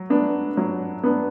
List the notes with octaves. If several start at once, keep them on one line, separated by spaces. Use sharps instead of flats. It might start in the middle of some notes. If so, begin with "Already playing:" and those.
Already playing: F#3
B3 D4
F#3
B3 D4